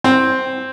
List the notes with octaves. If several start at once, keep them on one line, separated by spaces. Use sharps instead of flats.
C4